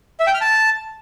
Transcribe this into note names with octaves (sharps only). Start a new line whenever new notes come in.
E5
G5
F6
A5